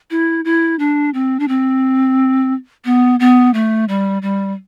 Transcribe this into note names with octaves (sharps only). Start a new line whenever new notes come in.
E4
E4
D4
C4
D4
C4
B3
B3
A3
G3
G3